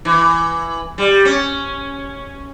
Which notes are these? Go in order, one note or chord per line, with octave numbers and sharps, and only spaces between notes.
E3
G3
C#4